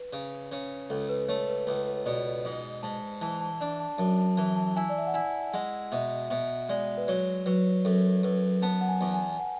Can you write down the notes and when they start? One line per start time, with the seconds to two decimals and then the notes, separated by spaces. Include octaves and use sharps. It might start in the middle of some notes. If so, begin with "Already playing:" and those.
Already playing: B4
0.13 C#3
0.52 C#3
0.90 C#2 A4
1.09 B4
1.28 A3 C#5
1.48 B4
1.67 C#2 B4
2.06 B2 D5
2.45 G#2
2.83 G#2 A5
3.22 E3 A5
3.41 A5
3.61 D4 A5
3.80 A5
3.98 F#2 A5
4.19 A5
4.37 E3 A5
4.56 A5
4.76 E4 G#5
4.89 D5
4.98 E5
5.07 F#5
5.14 E4 G#5
5.53 G#3 F#5
5.92 B2 E5
6.30 B2 E5
6.69 G#3 D5
6.97 B4
7.08 F#3 C#5
7.46 F#3 B4
7.85 F#2 A4
8.23 F#2 B4
8.62 B3 A5
8.81 F#5
8.88 G#5
9.01 E2
9.14 G#5
9.30 G#5
9.40 F#5